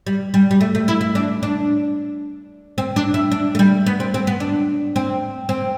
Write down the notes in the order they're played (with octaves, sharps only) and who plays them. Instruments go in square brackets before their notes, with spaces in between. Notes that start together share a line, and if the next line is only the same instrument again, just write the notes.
[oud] G3
G3
G3
A3
A3
E4
E4
D4
D4
C4
D4
E4
D4
A3
G3
B3
C4
C4
B3
D4
C4
C4